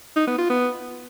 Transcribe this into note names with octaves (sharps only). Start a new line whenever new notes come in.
D#4
B3
F4
B3